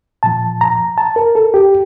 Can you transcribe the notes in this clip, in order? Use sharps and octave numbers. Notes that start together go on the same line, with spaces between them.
A#2 F3 A5
A#5
A5
A#4
A4
G4